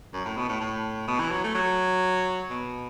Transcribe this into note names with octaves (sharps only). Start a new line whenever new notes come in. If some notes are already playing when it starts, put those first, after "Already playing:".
F#2
A2
B2
A2
A2
B2
E3
F#3
A3
F#3
B2